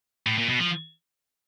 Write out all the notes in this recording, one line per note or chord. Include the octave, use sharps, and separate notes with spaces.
A2
A#2
B2
F3